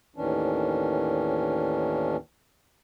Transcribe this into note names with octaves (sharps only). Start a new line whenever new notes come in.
D#2 A2 D#3 E3 C#4 D4